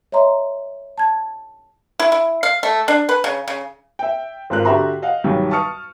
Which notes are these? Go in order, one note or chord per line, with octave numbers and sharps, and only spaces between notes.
C#5 D#5 E5 A#5 C6
A5 G#6
E4
E4
F5
A3
D4
B4
C#3
C#3
E5 G5
G#1 G#2 C4 F4 A#4 F#6
D3 F#4 G4 E5 A#5 C6
D#5 F5 F#5
B1 D#3 F#3 G3
A5 C#6 D#6 F6 C#7